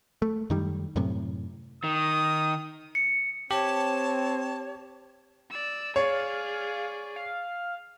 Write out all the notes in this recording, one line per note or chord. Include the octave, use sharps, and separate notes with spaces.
A3
F#2 D#3 G3
F#2 A2 C3
D#3 D#6
C#7
C4 G4 C#5 A5
D5 E6
G#4 C#5 D5 F5
F5